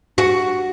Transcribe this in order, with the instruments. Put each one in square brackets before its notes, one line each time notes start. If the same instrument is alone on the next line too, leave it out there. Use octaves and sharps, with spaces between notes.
[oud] F#4